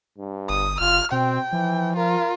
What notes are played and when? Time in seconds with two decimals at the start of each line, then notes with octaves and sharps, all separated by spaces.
0.18 G2
0.49 G1 D#6
0.80 F#1 F4 F6
1.12 B2 C4 G5
1.53 E3 F3
1.96 F4 A#4